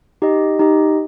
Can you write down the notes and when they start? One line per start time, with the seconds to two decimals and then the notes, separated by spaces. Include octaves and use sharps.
0.22 D#4 G4 D#5
0.59 D#4 G4 D#5